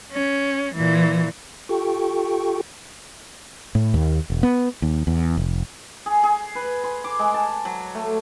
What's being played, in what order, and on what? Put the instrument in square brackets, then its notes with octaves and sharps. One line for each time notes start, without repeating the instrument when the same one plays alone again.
[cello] C#4
A#2 E3
[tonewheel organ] F4 G4 A4 G5 C#6
[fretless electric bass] A2
D#2
E1
B3
D#2
E2
F1
[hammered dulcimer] G#4
G#4
B4
C6
D6
G#3
A5
F#3
A3